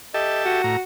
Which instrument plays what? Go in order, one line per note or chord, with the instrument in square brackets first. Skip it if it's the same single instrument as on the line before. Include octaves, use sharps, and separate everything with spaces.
[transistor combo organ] G4 A4 E5 [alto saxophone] D#5
[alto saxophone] F#4
[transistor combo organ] A2 A#5